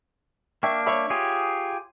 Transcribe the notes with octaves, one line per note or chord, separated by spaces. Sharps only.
A#3 D4 E5 G5 C#6
C#5 E5 B5
F4 G4 G#4